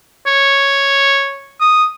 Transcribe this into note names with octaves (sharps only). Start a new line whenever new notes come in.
C#5
D#6